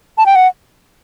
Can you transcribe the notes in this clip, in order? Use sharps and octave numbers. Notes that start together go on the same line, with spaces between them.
A5
G5
F#5